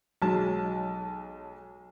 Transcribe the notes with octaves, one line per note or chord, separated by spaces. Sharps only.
B1 F#3 G#3 A5